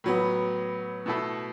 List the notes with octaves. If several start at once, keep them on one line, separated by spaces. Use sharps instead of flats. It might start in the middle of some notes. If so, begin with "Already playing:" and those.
A2 F#3 B3
B2 A3 E4 A4